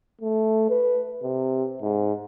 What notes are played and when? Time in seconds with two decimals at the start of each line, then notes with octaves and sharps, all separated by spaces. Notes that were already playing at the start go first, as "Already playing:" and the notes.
0.22 A3
0.70 B4
1.23 C3
1.82 G#2